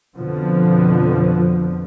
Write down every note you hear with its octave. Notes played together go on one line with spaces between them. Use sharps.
F2 B2 D3 F3